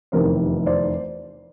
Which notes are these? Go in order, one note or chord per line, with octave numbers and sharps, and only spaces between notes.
F1 E2 C3 D#3 A#4 C5
C5 D5